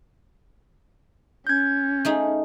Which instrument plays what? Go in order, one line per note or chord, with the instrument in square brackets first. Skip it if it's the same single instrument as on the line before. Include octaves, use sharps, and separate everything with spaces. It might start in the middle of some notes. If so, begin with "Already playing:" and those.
[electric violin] C#4 [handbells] G6 G#6
[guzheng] A3 D#4 G#4